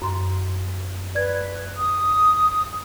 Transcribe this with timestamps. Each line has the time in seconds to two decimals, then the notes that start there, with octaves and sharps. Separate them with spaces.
0.02 F#2 C6
1.15 B4 D5 G#6
1.77 D#6